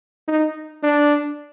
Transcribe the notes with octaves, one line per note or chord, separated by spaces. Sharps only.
D#4
D4